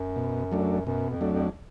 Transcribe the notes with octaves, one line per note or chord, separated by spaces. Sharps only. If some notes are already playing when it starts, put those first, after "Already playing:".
Already playing: F#2
B2
F#3 A3 D4
F#2 B2
F2
F#3 A3 D4
F2